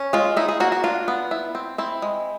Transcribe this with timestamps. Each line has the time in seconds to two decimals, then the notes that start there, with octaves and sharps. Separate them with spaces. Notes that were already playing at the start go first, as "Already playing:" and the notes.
Already playing: C#4
0.13 G#3 F4
0.37 D#4 E4
0.49 G#4
0.60 A#3 F#4
0.72 F#4
0.84 D4 F4
1.08 B3
1.31 E4
1.55 C4
1.78 C4 E4
2.02 G#3